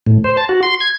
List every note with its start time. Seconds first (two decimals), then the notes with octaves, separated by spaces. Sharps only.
0.07 A2
0.24 C5
0.37 A5
0.49 F#4
0.63 C6
0.80 G#6